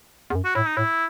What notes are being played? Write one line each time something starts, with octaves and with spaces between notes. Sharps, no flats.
E2
F#2
F#4
A2 E4
D#4
A2 E4